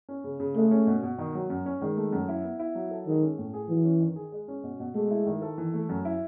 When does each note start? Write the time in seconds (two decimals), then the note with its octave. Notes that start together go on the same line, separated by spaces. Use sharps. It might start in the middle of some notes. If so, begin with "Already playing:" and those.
0.09 C#4
0.24 C#3
0.40 C#3
0.56 G#3 A3
0.71 C#4
0.87 B2
1.03 B2
1.19 D#3
1.35 F#3
1.50 F#2
1.66 C#4
1.81 D#3 G#3
1.97 A3
2.12 F#2
2.28 E4
2.44 B3
2.59 E4
2.75 F#3
2.91 A4
3.07 D#3 G#3
3.22 C#4
3.38 A2
3.54 G#4
3.69 E3 F#3
3.85 C#4
4.00 D#3
4.16 G#4
4.32 G#3
4.48 C#4
4.64 B2
4.80 B2
4.95 G#3 A3
5.11 E4
5.26 D#3
5.42 A4
5.58 E3
5.73 A3
5.89 F#2
6.05 E4